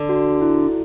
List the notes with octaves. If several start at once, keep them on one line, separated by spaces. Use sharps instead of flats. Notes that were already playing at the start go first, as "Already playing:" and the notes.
Already playing: D3
F#4
E4